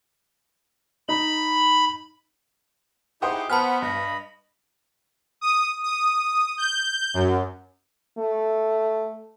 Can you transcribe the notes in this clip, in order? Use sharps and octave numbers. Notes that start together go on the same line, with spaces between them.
D#4 B5
D#4 E4 G4 G#4 C5 F#5 D#6
B3 B4 C5 F#5 G#5 A5 B5 F6
G2 D#5 B5
D#6
D#6
G6
F#2
A3